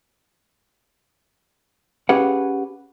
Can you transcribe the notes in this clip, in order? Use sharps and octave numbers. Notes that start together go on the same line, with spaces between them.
C#4 G4 G#4 B4 F5 F#5